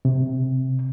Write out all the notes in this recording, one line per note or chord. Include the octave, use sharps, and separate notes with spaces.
C3